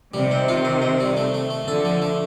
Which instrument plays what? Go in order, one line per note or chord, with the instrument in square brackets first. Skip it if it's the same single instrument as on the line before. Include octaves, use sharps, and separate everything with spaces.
[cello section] C3 D#3 [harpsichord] G3
[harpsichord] C4
F4
C4
C4
G3
A3
A3
A3
[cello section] D3 F3 [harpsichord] A4
[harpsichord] A3
A3